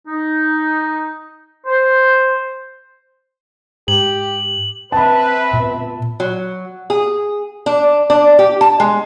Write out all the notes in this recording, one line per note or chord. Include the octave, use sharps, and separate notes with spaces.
D#4
C5
G#2 G4 F#7
C4 B4 E5 A5 B5
A#2 B3
F#3
G#4
D4
D4
G4
A5
G#3